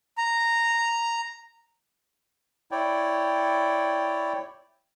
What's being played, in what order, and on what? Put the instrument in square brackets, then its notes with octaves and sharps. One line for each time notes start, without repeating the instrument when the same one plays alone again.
[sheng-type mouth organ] A#5
[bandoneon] E4 C#5 D5 G5